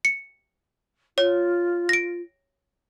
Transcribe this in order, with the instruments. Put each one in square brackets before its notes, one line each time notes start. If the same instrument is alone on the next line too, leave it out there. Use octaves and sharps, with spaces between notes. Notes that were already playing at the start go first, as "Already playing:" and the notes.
[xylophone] C#7
[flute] F4 [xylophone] C#5
[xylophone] A#6 D7